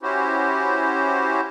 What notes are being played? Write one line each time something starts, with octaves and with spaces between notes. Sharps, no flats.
C#4 E4 F#4 G4 C5